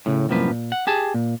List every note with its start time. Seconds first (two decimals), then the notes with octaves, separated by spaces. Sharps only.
0.06 A2 C#3
0.29 C2 F#2 A2 F3 A#3 B4
0.51 A#2
0.72 F#5
0.87 G4 G#4 A5
1.14 A#2